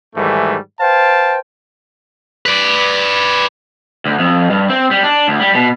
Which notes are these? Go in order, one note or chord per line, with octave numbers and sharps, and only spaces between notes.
G#2 D#3 E3 G3 A3
B4 C5 F5 G5 A5
B4 D5
D2
F2
G2
C4
G3
D4
D2
G3
B2